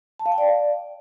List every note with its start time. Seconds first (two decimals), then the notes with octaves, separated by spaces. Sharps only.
0.19 A5
0.26 F5
0.32 G5
0.38 D5